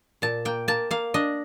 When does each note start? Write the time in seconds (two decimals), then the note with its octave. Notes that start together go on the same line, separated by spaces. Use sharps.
0.22 A#2 A5
0.45 A#3 G5
0.68 A#3 A5
0.91 A#3 F5
1.14 D4 D#5